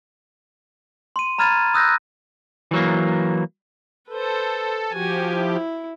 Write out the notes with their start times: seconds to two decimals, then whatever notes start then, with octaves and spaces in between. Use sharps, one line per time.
1.16 C6 D#7
1.38 A#5 B5 F6 G#6 A6 D#7
1.74 D#6 E6 F#6 G6 A#6
2.71 E3 F#3 A#3
4.09 A4 B4 C5
4.93 F3 F#4 G4 G#5
5.35 E4